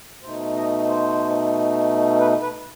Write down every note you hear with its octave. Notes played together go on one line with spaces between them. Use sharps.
B2 A3 D#4 C5
D#5
C5
B4
B4